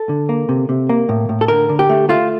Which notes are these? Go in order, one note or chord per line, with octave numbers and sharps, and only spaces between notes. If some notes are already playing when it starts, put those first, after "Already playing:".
Already playing: A4
D3
A#3
C3
C3
A#3
A2
A2
A4
D3 A#4
D3
G4
A3
A3 F4